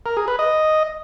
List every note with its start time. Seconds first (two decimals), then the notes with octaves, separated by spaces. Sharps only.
0.06 A#4
0.17 G#4
0.28 B4
0.39 D#5